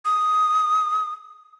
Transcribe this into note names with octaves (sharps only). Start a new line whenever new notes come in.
D#6